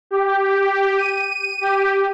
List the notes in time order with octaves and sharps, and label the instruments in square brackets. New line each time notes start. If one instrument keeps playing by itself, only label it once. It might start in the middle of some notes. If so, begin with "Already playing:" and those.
[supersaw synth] G4
D#7
G4